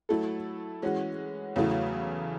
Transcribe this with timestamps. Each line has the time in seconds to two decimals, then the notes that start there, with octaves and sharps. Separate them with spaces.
0.09 F#3 A3 E4 A4
0.82 E3 G#3 C#4 F#4
1.56 E2 C#3 F#3 A3 E4